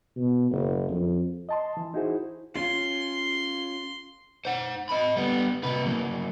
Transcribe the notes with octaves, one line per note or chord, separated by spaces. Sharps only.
B2
F#1
F2
D#5 A5 C6
E3
D#4 E4 F#4 G#4 C5
C#4 F4 C6
C5 F#5
D#5 B5
G3 B3
C3 B4
F#3 A#3